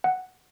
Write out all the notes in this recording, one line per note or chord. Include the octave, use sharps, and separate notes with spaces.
F#5